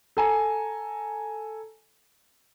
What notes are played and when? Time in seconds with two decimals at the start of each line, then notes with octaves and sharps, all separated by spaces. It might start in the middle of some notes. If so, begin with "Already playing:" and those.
0.17 A4 G#5 A#5